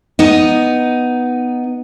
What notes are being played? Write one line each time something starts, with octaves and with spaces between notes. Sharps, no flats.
B3 D#4